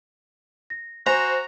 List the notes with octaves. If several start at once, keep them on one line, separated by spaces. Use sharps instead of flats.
A#6
F#4 C5 G#5 A#5